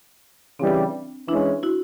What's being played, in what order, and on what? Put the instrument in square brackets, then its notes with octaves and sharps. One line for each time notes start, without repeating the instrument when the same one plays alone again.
[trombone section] C#3 E3 G3 [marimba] C4 D4
[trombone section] E3 G#3 C#4 [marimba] D4 E4
[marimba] E4 F#4